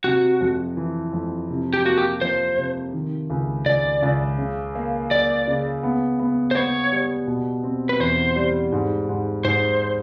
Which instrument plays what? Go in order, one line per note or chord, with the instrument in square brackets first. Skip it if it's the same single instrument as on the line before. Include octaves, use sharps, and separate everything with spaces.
[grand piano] C3 [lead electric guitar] F#4
[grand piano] F2
E3
F2
C3
[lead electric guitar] G4
[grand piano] A#3 [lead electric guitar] F#4
[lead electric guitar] G4
[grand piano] F3 [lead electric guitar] C5
[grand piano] C3
D#3
C#2
[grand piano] C#2 [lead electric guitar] D5
[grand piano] C#2
C#3
A#3
[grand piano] A#3 [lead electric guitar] D5
[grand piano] C#3
B3
B3
[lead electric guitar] C5
[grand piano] B3 [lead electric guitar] C#5
[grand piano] G3
B2
C4
[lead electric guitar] B4
[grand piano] E2 [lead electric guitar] C5
[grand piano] G3
G#2
G#2
[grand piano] G#2 [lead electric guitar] C5